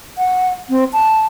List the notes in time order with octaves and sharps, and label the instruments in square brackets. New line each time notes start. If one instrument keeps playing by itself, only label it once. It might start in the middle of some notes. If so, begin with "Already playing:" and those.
[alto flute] F#5
C4
A5